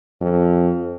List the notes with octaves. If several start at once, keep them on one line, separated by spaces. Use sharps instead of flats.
F2